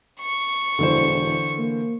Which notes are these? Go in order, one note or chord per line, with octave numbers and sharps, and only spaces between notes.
C#6
E1 D3 E3 C5
A#3